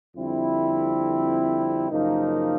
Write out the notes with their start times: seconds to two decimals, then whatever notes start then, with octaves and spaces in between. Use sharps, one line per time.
0.15 F2 D3 G3 C4 E4
1.91 F#2 C#3 F3 A#3 D#4